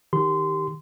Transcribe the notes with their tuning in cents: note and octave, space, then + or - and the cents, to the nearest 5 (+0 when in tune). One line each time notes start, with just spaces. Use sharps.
D#3 +0 G4 +0 C6 -20